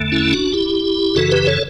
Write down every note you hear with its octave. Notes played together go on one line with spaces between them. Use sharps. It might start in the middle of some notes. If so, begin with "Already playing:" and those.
Already playing: E2 D3 A3
C#4 E4
D4 F#4
E4 G4
F#2 C#3 E3 F#4 A4
G4 B4
A4 C#5